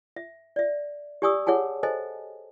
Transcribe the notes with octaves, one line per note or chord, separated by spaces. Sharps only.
E5
D5 E5
G4 D5 G#5 C#6 D#6 E6
G#4 C#5 F#5 G#5 A5
A4 C5 D#5 G#5 A5